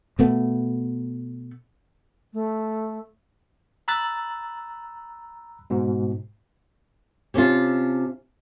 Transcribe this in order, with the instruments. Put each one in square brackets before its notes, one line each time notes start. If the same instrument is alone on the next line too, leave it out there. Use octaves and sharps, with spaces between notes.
[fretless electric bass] B2 A3 B3
[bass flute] A3
[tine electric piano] A#5 B5 E6 F#6 A6
G#2 B2
[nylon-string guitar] C3 C#4 D4 F4